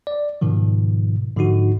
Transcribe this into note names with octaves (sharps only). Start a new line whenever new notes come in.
D5
G#2 B2 D#3 F3
G#2 D3 F3 D#4 F#4